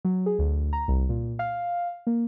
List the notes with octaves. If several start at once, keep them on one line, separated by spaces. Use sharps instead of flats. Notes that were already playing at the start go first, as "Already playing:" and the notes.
F#3
G#4
D2
A#5
C2
A#2
F5
A#3